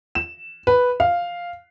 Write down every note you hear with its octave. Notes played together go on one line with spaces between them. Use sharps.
E7
B4
F5